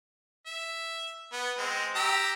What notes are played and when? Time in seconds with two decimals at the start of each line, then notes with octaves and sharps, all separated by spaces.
0.46 E5
1.32 B3
1.58 G#3 C4
1.95 G4 A#5 E6